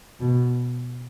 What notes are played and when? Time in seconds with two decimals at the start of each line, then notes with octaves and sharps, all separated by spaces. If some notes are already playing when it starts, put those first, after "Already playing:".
0.20 B2